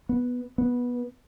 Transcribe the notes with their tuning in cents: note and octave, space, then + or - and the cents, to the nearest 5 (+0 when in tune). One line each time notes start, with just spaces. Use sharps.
B3 -5
B3 -15